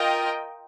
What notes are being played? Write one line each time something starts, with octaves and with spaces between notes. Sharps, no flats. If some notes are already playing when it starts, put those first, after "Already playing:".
Already playing: F4 A#4 D#5 G5